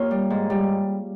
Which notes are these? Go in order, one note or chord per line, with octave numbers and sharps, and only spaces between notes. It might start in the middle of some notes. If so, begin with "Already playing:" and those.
Already playing: A#3 F4 G4 C#5
G3
G#2
G3